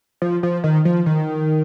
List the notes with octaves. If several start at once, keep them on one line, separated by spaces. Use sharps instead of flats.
F3
F3
D#3
F3
D#3